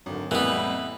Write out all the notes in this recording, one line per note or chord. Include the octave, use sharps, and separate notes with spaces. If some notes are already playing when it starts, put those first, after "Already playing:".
G#1 D3 F#3
F2 A2 E3 G3 A#3 B3 F#5